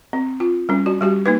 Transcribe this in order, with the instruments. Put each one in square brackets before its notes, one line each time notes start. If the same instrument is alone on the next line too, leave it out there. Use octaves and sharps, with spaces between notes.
[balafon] C4
F4
G3 C#4
F#4
G3 F#4 G4
A#3 D#4 B4